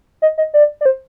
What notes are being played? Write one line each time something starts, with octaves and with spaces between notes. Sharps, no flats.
D#5
D#5
D5
D5
C5